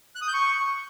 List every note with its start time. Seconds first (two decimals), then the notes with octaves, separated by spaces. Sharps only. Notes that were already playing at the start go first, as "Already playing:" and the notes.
0.16 F#6
0.22 D#6
0.27 G6
0.33 C#6